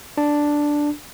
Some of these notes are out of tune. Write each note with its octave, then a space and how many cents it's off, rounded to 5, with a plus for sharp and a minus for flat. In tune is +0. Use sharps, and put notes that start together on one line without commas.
D4 +0